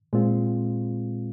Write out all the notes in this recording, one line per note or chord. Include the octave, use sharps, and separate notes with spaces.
A#2 G#3 C4 F4